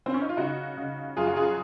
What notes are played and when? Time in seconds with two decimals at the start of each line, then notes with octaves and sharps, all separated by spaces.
0.06 C4
0.14 C#4
0.22 D#4
0.29 F4
0.37 C#3 D#4 F#4
0.77 C#3
1.17 F#2 F4 G#4
1.27 F#4
1.36 F4 G#4